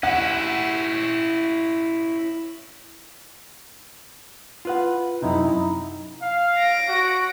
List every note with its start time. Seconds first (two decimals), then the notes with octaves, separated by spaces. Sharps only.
0.03 C#4 E4 F#5
4.65 F4 B4 F#5
5.22 F#2 C3 D#4 E4
6.22 F5
6.58 A#6 D7
6.88 F#4